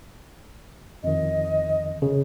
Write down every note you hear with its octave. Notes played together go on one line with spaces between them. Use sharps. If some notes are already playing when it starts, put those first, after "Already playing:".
F2 D#3 D#5
C#3